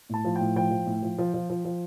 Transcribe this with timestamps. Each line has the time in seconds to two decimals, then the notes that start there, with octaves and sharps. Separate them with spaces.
0.09 A2 A5
0.25 F3
0.36 A2 G5
0.56 F3 G5
0.71 F3
0.86 A2
1.03 F3
1.19 F3
1.34 F3
1.50 F3
1.65 F3